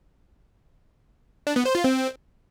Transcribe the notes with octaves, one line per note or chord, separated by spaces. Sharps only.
D4
B3
C5
F4
C4